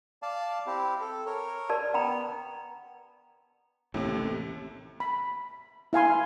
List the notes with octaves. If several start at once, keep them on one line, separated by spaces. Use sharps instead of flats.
D5 F5 A5
C4 E4 G4
A4
A#4 C#5
A#4 D5 A5
B3 G5 A#5 B5
A1 D#2 A2 C3
B5
E4 F5 G#5 C6